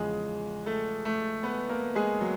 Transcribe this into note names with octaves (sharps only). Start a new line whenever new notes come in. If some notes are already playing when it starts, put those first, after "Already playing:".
Already playing: E2 C#3 F3 G#3 G#4
A3 A4
A3 A4
B3 B4
A#3 A#4
G#3 G#4
F#3